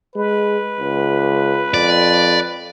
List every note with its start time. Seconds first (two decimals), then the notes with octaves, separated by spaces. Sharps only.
0.16 G#3 B4
0.81 C#2
1.74 F2 D5